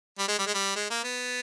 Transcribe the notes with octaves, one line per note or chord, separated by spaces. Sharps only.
G3
G#3
G3
G#3
G3
G#3
A#3
B3